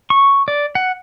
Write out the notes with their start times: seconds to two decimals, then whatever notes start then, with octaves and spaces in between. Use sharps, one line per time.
0.10 C#6
0.48 D5
0.75 F#5